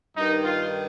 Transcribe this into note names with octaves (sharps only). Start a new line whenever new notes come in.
G2 D#3 D#4
F4